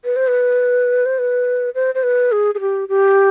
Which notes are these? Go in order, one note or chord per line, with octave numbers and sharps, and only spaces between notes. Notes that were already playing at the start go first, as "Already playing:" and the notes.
B4
C5
B4
C5
B4
C5
C5
B4
G#4
G#4
G4
G4